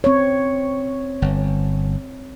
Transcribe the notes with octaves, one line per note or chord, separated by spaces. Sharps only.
C4 C#5
G1